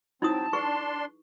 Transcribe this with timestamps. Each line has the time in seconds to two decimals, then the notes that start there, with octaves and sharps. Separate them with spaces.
0.22 F#3 C4 D#4 E4 A5 D#6
0.53 D4 G#4 B4 C6 C#6